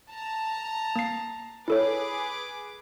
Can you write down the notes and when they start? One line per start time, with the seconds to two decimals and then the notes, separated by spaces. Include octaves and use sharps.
0.11 A5 A#5
0.96 A#3 C7
1.68 E4 G#4 A4 B4 C#5 D6